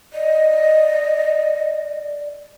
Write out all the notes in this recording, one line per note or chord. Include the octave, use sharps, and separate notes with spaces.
D5 D#5